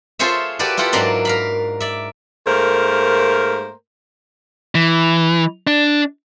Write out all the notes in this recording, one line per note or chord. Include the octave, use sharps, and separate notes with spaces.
F4 G#4 A4 C5 C#5 E5
F#4 G4 A4 B4 D5
E4 F4 G4 A4 F#5
G#2 F#3 D4 A#4 D5 C6
A#4 F5 B5
D5 E5
G#2 A3 A#3 A#4 C5
E3
D4